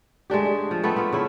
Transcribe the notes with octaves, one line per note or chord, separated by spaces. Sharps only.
G#3 A3 D4 G4
G#4
F3
A3 B3 C4
B3 F4
C#3 E4